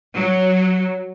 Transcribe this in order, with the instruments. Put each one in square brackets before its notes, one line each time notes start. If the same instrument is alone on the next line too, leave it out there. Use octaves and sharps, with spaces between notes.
[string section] F#3